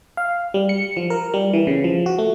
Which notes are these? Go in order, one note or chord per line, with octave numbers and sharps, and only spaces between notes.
F5
G3
C#7
F3
A#4
G3
E3
C#3
F3
F#4
A3